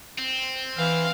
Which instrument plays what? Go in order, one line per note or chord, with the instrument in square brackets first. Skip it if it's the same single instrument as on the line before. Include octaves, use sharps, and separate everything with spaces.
[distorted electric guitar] C4
[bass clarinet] E3 [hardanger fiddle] F5